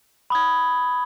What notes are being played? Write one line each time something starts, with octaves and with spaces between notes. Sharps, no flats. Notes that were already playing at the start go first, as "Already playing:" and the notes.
B5 D#6 G#6